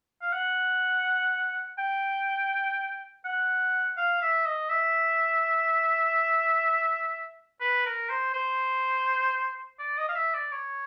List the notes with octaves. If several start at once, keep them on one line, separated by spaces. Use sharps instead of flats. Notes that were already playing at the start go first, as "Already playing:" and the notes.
F5
F#5
G5
F#5
F5
E5
D#5
E5
B4
A#4
C5
C5
D5
D#5
F5
E5
D5
C#5